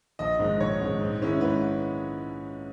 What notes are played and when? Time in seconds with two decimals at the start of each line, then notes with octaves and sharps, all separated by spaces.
0.19 A#1 D#5
0.39 G#2 D#3 G#3
0.60 A#1 C#5
0.80 G#2 D#3 G#3
1.01 G#2
1.21 D#3 G#3 C#4 E4
1.41 G#2 B4